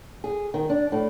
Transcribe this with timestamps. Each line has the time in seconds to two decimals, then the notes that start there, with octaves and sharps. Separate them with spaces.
0.24 G#4
0.54 D#3
0.70 D4
0.92 A2